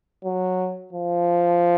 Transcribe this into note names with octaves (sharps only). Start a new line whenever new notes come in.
F#3
F3